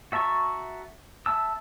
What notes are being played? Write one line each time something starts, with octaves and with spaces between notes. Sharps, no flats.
F#4 E5 A5 A#5 C#6
E5 A5 E6